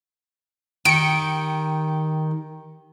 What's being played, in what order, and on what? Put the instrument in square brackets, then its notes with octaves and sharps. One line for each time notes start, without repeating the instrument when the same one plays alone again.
[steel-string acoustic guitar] D#3 G4 [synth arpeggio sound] C#7 D7